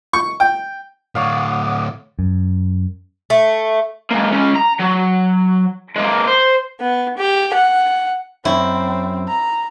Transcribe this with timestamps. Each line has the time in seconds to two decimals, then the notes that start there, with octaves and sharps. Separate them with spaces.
0.13 C#6
0.40 G5
1.15 A2 D3 C#5 D5 F5 F#5 D6 D#6
2.19 F#2
3.30 A3
4.11 G#3 A#3
4.32 G#3 C#4
4.56 A#5
4.80 F#3
5.96 G#3 A#3
6.27 C5
6.81 B3
7.18 G4
7.54 F#5
8.45 F#2 C4 E4
9.28 A#5